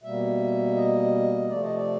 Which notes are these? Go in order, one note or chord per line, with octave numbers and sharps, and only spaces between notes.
B2 G3 A#3 E5
D#5
C3 F3 A3 D5
D#5
D5